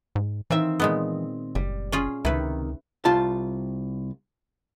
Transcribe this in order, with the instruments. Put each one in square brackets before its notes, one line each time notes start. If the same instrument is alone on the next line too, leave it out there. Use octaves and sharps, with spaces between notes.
[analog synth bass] G#2
[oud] D#3 C4 E5 [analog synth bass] E3
[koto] A#2 G#3 B3
[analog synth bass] F#1 [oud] G3
[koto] C#4 F4 G#4
[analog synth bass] C#2 [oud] C3 D#3 [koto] E4 B4
[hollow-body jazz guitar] C2 F4 A5